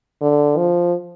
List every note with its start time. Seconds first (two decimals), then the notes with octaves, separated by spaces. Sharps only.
0.21 D3
0.57 F3